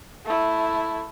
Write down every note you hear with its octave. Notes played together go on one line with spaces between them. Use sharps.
A3 E4